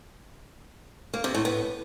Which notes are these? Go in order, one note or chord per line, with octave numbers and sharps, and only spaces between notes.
A#3
C3
A2
B3